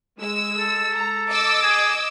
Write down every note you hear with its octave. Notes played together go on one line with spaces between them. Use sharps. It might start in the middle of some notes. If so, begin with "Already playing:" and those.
G#3 E6
A4
A#5
D#5 D6 E6
G#4